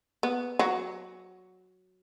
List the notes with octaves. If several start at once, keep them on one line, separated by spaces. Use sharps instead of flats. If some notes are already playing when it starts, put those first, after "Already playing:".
B3
F#3 F#4